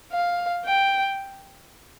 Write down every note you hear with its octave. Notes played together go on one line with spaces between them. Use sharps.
F5
G5